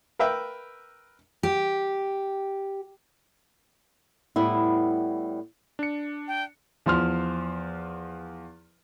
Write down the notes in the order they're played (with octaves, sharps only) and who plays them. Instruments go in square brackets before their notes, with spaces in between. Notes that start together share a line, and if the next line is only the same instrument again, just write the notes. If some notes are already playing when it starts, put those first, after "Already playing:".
[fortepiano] A#4 B4 E5 G5
[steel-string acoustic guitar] G4
[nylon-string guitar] A2 G3 B3 E4
[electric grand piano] D4 C#7
[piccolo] G5
[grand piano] E2 F3 C6 F6